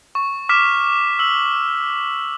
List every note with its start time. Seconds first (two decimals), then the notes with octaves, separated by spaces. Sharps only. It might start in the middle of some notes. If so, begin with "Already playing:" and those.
0.15 C#6
0.49 D6 F6 B6 E7
1.19 E6 F#7